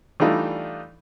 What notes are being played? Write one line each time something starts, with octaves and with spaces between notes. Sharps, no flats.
E3 G3 A3 D4 D#4 F4